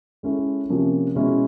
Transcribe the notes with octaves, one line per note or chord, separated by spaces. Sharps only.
G#3 C#4 E4 A4
C3 F3 A#3 C#4
B2 G#3 C#4 E4